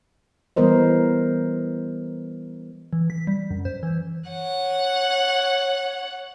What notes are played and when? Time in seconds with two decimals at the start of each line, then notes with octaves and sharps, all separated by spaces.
0.56 E3 G3 B3 A#4 C5 D#5
2.93 E3
3.10 B6
3.27 G3
3.51 F#2
3.65 C5
3.83 E3
4.30 C#5 F#5